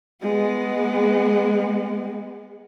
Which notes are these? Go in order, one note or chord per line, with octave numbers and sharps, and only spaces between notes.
G#3 B3